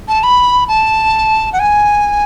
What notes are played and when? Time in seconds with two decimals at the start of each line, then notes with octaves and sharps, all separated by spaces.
0.08 A5
0.23 B5
0.68 A5
1.53 F#5
1.59 G#5